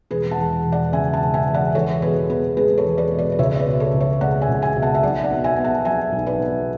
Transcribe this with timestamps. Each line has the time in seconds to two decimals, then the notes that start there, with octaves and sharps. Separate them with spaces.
0.11 E1 G#4 B4
0.31 F#5 A5
0.38 E2
0.65 E1
0.72 D5 F#5
0.93 C#3 E5 G#5
1.13 F#5 A5
1.20 E1
1.34 E5 G#5
1.47 E2
1.54 D5 F#5
1.75 E2 A4 C#5
2.02 B2 G#4 B4
2.30 B3 G#4 B4
2.57 G#3 G#4 B4
2.78 A4 C#5
2.84 E2
2.98 B4 D5
3.12 B2
3.18 B4 D5
3.32 D5
3.39 C#2 C#5 E5
3.56 E5
3.60 B4 D5
3.66 B2
3.80 A4 C#5
3.94 C#2
4.01 C#5 E5
4.21 G#3 D5 F#5
4.41 E5 G#5
4.48 C#2
4.62 E5 G#5
4.76 B2
4.82 F#5 A5
4.95 E5
5.03 B1 D5 F#5
5.24 D5 F#5
5.31 B2
5.44 E5 G#5
5.58 B3
5.64 F#5 A5
5.85 F#3 E5 G#5
6.12 B1
6.26 B4 D5
6.39 B2